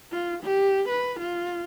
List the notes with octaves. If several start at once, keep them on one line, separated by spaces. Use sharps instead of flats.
F4
G4
B4
F4